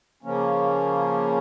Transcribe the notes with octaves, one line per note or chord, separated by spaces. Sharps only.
C#3 F3 A#3 C#4